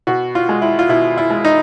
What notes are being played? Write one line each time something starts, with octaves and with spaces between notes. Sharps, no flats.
B2 F#4
F4
G#3
E4
F4
B2 E4
E4
G#3
D#4